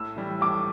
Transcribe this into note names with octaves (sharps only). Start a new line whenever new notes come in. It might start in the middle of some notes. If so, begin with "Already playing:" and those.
Already playing: A2 E6
E3 G3
A2 D6